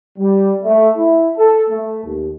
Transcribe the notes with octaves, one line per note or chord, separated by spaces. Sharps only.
G3
A3
E4
A4
A3
D#2